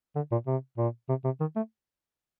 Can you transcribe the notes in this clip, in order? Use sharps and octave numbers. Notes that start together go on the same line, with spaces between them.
D3
A#2
C3
A#2
C3
C3
D#3
A3